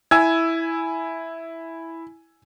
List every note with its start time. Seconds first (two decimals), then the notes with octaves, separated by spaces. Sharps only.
0.11 E4 G#5 E6 G#6